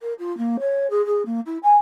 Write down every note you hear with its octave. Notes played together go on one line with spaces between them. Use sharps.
A#4
F4
A#3
C#5
G#4
G#4
A#3
E4
G#5